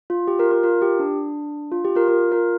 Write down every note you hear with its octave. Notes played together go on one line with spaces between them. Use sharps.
F4
G4
F4 A#4
F4 A#4
F4 A#4
G4
D4
F4
G4
F4 A#4
F4 A#4
F4 A#4